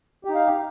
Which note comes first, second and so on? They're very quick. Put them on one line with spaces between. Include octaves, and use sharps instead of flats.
G4 D#4 F5